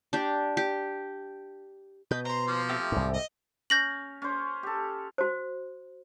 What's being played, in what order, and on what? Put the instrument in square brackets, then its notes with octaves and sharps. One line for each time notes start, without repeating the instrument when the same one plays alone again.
[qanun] D4 G4
G4
[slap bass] B2 [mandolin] B4 D#5 G6
[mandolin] C5 C6 [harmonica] A#5
[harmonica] F3 A#3
[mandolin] A3 C4 G4
[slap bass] C2 G#2
[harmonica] D#5
[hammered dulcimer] C#4 [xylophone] G6 A#6 F#7
[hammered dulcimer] C#4 C5
G4 A4
[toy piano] F#4 C5